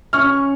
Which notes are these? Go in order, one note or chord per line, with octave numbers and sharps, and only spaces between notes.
C#4 C#6 F6